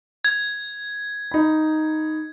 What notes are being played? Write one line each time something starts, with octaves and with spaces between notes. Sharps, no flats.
G#6
D#4 B5